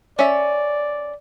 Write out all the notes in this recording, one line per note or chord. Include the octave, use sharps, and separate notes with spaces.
C#4 D5 E5